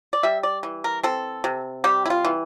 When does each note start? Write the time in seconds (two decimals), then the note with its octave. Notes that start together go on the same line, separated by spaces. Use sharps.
0.13 D5
0.23 G3 E5
0.43 D5
0.63 E3
0.84 A#4
1.03 C4 A4
1.44 C3
1.84 G3 G4
2.06 E4
2.10 F4
2.25 E3